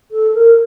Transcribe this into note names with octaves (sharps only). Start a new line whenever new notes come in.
A4
A#4